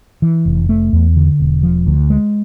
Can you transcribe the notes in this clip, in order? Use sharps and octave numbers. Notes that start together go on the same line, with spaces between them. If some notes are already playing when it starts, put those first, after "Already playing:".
E3
F1
A3
E2
D3
E1
F3
D2
G#3